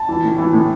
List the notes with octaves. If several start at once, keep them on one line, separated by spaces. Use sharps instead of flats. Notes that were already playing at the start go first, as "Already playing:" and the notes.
Already playing: A5
E3
A2
E3
A2